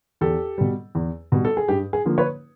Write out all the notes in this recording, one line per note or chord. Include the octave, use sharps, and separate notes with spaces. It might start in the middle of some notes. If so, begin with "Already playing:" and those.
E2 G4 A4
B2 G3
E2
B2 G3
A4
G#4
G2 G4
G#4
D3 F3 A#3
B4 C#5